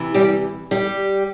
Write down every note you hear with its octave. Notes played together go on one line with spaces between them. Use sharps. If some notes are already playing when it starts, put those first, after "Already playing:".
Already playing: C3 E3
G3 G4
G3 G4